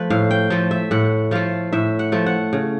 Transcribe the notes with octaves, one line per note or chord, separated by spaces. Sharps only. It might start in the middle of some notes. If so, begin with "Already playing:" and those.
Already playing: F3 A3 B4
A2 F5
G5
F3 A3
E5
A2 F#5
F3 A3 F5
A2 E5
F#5
F3 A3
F#5
C#3